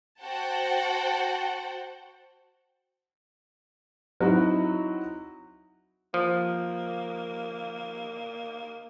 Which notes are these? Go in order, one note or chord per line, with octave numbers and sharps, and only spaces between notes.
F#4 C5 F#5 G5 A5
F#3 C4 D#4 E4 F#4
F3 A#3